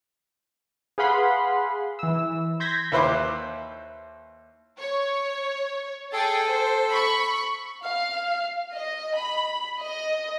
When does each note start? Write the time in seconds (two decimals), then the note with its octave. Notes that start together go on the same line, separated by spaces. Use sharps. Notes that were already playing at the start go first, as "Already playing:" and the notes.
0.98 G#4 B4 F5 F#5 B5 C6
1.99 E3 E6
2.60 C6 G6 G#6 A#6 B6
2.92 D#2 E4 B4 C5 C6 D6
4.79 C#5
6.13 G#4 A4 G5 A6
6.47 C5
6.89 B5 C#6
7.83 F5
8.73 D#5
9.16 B5
9.81 D#5